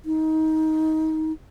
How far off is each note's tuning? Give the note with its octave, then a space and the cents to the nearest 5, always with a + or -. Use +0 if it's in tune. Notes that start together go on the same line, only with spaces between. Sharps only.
D#4 +20